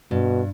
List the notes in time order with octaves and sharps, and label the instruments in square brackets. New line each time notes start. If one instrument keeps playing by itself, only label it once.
[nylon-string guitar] G2 [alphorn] B2